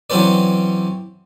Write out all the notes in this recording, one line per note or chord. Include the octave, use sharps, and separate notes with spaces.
E3 F#3 C4 C#4 B4 D5